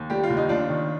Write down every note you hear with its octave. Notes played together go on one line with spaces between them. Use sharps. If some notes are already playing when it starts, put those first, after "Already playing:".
Already playing: D#2
G3 G4
F4
D#2
D#4
D#2 D4 F4
D#3